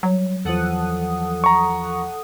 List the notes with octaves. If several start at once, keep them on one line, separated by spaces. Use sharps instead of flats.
F#3 G3 C#5
E2 E3 F3 A4 F#5 D#6
A#5 C#6